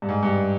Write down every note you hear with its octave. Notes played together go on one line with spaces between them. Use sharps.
G2
G#2
G2